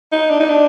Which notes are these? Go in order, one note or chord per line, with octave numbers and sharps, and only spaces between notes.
D#4
D4
D#4
D4